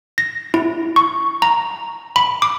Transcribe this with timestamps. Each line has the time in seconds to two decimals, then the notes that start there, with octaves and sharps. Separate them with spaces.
0.18 A#6
0.54 E4
0.96 C#6
1.42 A#5
2.16 B5
2.42 D6